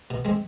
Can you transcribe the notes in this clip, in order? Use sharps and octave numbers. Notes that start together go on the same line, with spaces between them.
B2
G#3 C4